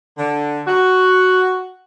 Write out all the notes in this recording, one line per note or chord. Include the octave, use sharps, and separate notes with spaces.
D3
F#4